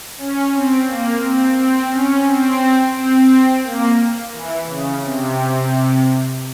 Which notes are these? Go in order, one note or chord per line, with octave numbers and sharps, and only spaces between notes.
C#4
C4
A#3
C4
C4
C#4
C4
C4
A#3
E3
C#3
C3